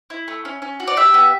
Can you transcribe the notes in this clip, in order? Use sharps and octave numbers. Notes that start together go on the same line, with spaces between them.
E4
A3
C#4
C#4
F#4
D5
G4 E5
B3